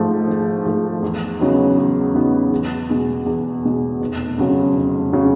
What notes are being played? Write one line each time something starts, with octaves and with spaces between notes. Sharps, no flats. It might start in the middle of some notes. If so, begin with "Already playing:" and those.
Already playing: G#1 G#2 F3 A3
G#1
G#2 F3 A3
E2
C#3 F#3 B3 D#4
E2
C#3 F#3 B3 D#4
E2
B2 G#3
E2
B2 G#3
F1
F2 C#3 F#3
F1
C#3 F#3